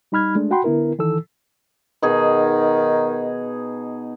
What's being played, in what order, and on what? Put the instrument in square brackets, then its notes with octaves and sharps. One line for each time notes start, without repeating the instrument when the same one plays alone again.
[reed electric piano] G3 D#4 B5 F6 G#6
G#3 A3 D4
F#4 F#5 G5 B5 C6
D3 B3 E4 A#4
D#3 E3 A4 E6
[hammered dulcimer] B2 D#4 G#4 [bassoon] D#3